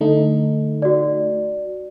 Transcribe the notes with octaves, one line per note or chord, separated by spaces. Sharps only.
D3 A3 D#4
F#4 D5